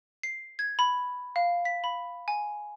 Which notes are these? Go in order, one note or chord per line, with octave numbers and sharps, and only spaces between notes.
C7
G#6
B5
F5
B6
B5
G#5